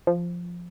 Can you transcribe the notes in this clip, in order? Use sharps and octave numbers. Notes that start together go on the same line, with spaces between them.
F3